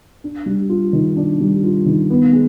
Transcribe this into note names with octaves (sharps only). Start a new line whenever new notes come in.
D4
G3
F4
D#3
D4
G3
F4
D#3
B3
G#3